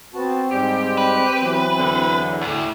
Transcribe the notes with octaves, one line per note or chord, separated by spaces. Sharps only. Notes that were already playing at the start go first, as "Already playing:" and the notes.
B3 C4 F#4 A5
G#2 G3 G#3 G4
B4
E3 F#3 B3
E2 D3
D2 A2